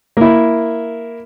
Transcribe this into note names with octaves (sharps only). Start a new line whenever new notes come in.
A#3 E4